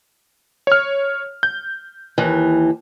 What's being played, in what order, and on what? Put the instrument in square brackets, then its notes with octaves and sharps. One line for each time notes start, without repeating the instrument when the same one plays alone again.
[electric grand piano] C#5 F6
G6
[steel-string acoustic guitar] D#2 E3